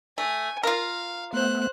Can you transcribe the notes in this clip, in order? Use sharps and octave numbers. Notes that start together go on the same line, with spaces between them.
A3 G#5
F4 A#4 F5
A3 B3 C5 F#6